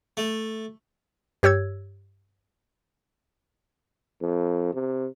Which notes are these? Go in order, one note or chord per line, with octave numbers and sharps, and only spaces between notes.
A3
G2 G4 C#5 E6 G#6
F2
C3